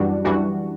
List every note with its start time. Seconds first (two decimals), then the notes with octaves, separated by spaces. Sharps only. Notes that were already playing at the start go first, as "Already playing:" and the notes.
Already playing: F#2 E3 G3 D4 F#4
0.24 F#2 E3 G3 D4 F#4